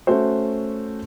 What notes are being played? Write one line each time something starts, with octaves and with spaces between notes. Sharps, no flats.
A3 C#4 F#4 C5